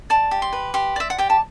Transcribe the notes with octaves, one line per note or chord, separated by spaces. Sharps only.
D5 A5
G4
C6
B4
G4 C6
D5 E5
F#5
G4 G5
A5